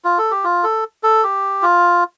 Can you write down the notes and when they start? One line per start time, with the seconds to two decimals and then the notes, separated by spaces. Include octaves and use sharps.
0.05 F4
0.18 A4
0.31 G4
0.44 F4
0.63 A4
1.03 A4
1.23 G4
1.62 F4